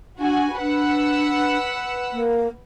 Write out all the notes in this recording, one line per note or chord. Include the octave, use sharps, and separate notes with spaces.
D4 F#4 G#5
D4 B4 F#5 E6
A#3